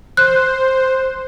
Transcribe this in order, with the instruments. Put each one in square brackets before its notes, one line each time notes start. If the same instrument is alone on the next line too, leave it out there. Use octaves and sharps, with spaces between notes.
[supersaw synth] C5 [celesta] F#6